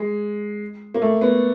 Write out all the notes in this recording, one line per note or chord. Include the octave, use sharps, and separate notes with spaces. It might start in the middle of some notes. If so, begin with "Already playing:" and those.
Already playing: G#3
A#3
A3
B3